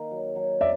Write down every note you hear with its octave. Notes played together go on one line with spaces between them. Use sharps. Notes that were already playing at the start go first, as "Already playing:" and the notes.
Already playing: D#3 A#3
F#3
F#3
C4 D5 E5